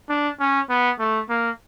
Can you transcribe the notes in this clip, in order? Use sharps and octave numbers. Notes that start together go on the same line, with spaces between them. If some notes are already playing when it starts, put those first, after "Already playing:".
D4
C#4
B3
A3
A#3